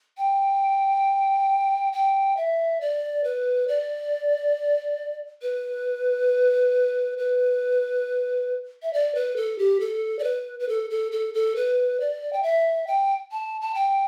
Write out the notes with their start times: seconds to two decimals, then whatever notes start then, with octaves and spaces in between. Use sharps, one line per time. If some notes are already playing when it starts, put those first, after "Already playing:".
0.18 G5
1.93 G5
2.37 E5
2.81 D5
3.24 B4
3.68 D5
5.42 B4
7.18 B4
8.82 E5
8.93 D5
9.15 B4
9.36 A4
9.59 G4
9.80 A4
10.19 D5
10.24 B4
10.60 B4
10.69 A4
10.90 A4
11.12 A4
11.34 A4
11.56 B4
12.00 D5
12.33 G5
12.43 E5
12.87 G5
13.32 A5
13.61 A5
13.74 G5